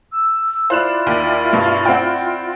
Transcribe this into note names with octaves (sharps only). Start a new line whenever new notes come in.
E6
E4 F4 C5 D5 F#6 E7
D#2
G2 B2 C#6
C4 F#5 G5